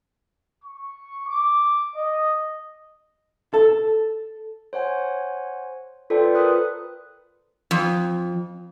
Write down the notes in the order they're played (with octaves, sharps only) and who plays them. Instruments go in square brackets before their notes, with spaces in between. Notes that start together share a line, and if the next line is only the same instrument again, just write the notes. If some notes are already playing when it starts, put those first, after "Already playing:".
[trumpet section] C#6
D6
D#5
[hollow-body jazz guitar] A4
[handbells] C5 C#5 F#5 G#5
F4 A4 B4 C5 D5 G5
A#4 B4 D#6 F#6
[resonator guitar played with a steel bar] F2